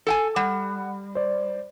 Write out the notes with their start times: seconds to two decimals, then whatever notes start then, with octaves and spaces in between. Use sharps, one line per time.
0.07 A4 G5 G#5
0.36 G3 F#5
1.15 C5 D5